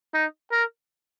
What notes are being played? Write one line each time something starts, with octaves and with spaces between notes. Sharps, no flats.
D#4
A#4